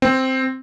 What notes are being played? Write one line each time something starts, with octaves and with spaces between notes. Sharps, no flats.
C4